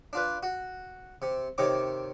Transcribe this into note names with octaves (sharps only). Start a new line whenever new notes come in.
D4 F4 B4
F#4
C3
C3 D#3 C#5 D6